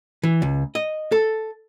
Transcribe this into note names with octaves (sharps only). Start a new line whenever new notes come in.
E3
C#2
D#5
A4